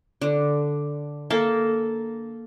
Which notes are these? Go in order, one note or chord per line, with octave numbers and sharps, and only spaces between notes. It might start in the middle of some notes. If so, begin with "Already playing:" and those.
D3
A#3 A4